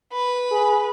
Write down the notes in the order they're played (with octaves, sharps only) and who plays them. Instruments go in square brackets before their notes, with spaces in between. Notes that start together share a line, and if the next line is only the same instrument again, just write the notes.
[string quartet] B4
[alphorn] G#4